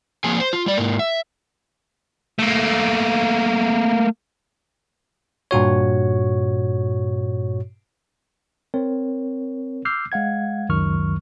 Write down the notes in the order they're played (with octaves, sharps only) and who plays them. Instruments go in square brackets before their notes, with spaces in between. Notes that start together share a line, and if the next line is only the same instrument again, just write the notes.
[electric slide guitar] F3 A#3 C4 G#4 G#5
C5
F4
G3 D5
G#2 A#3
E5
[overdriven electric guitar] A3 A#3
[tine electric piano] G2 A#2 F#4 C#5
C4 A#4 C#5
D6 E6 F6 G6 C7
G#3 F5 F#5 G#6
C#2 F#2 D#3 F#3 C#6 F6